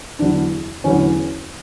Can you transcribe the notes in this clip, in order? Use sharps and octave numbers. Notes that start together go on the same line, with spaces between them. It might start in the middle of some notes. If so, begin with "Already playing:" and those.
E2 D3 F#3 B3 D4
E2 D3 F#3 B3 C#4